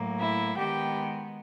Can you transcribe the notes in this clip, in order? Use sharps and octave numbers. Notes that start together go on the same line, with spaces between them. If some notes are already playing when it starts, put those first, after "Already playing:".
Already playing: A2 F#3 A#3
E4 E5
D#3 G#3 B3 G4 G5